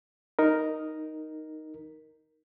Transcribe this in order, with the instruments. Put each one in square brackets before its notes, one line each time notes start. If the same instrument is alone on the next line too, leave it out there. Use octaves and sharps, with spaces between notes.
[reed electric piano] D#4 A#4